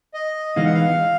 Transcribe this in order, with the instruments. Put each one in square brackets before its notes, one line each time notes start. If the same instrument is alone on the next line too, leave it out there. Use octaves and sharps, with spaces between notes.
[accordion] D#5
[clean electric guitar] E3 G#3 B3 D#4 [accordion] F5
[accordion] F#5
F5